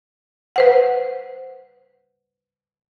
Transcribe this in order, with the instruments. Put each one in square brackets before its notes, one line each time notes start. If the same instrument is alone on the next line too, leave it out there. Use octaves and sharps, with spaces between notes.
[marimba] B4 C5 F#5